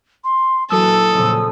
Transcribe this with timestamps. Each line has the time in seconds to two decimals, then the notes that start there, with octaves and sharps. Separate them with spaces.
0.24 C6
0.70 A#2 E3 F#3 A4 D#6 E6
1.11 F2 A#2 C#3